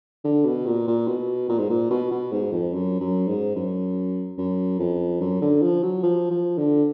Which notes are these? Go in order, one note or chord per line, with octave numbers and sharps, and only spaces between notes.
D3
B2
A#2
A#2
B2
A#2
G#2
A#2
B2
B2
G#2
F2
F#2
F#2
G#2
F#2
F#2
F2
F#2
D3
F3
F#3
F3
F3
D3